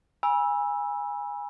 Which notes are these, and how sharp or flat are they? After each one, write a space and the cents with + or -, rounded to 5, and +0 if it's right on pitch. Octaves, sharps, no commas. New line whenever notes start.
G#5 -20 B5 -35 E6 +0